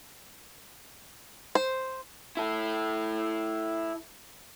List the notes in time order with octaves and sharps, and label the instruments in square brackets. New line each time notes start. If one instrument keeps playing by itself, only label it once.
[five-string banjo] C5
[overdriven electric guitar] E4 A4